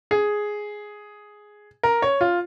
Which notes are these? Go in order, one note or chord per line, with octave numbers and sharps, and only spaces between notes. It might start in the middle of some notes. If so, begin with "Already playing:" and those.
G#4
A#4
C#5
F4